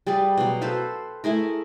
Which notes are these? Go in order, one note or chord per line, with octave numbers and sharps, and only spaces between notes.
G3 G#4 B4 D5
B2 F#3
A4 B4 C5 F5
A3 E4 G#4 A#4